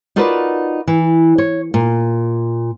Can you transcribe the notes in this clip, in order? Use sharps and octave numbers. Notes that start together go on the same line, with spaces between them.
D#4 F4 F#4 A#4 B4 D5
E3
C#5
A#2